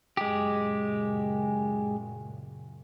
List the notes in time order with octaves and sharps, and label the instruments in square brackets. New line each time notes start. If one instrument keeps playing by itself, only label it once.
[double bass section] F#2 A#2 C#3 [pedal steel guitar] G#3 G4